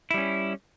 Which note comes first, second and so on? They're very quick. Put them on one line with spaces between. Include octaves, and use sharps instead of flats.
E4 G3 C#4